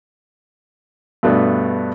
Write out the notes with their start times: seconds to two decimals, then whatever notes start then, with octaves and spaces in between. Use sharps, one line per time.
1.23 G2 B2 A3 B3 D4